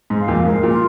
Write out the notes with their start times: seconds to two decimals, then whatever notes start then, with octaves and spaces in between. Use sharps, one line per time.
0.10 G#2
0.19 F5
0.28 F2 A#2
0.45 G#2 A#4
0.63 A#2
0.72 F4